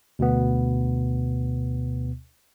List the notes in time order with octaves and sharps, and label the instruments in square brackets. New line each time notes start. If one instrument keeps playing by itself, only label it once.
[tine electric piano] D2 B2 B3